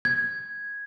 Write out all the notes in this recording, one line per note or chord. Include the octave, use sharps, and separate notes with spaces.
G#6